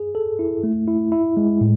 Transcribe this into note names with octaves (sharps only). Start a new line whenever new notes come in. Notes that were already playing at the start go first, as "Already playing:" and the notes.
Already playing: G#4
A4
E4
A3
E4
E4
G#3
A2